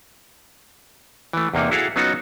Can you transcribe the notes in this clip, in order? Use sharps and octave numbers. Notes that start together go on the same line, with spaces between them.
E3 A3
E2 C3 A#3 D#4
E4 F#4 G#4 A4 F5
F#3 B3 C#4 D#4 F4 F#4